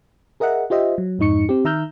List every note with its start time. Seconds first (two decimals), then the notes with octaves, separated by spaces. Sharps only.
0.40 G#4 A#4 D#5 E5 F#5
0.70 F4 G4 C5 D#5 E5
0.98 F#3
1.19 F2 G#2 D#4 C#6 C#7
1.49 C4 G4
1.65 D#3 E5 A#5 E6 F6 G6